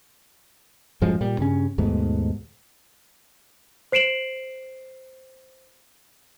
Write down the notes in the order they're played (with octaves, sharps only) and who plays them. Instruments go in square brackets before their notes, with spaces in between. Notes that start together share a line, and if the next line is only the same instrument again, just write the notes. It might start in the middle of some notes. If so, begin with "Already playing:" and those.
[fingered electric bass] F#2 A2 F3 G#3
A#2 G3
G2 C#3 C#4
D#2 G#2 B2 A3
[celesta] C5 C7 D7 E7 F#7